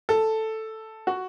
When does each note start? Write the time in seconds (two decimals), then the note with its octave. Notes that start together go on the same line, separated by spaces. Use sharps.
0.09 A4
1.07 F#4